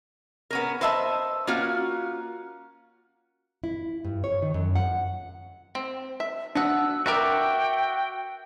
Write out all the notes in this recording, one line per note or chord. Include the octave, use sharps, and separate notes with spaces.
B3 C#4 A#4
B4 C5 D#5 E5 F#5 A5
A#3 C#4 F4 F#4
E4
G2
C#5
D#3
F#2
F#5
C4
E5
B3 D4 F#4 F#5 E6
F#4 A#4 B4 D5 E5 G5 D6